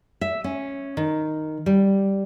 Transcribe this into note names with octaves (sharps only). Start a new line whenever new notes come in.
E5
C#4
D#3
G3